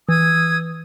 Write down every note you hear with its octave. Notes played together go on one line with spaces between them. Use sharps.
E3 D#6 E6 G#6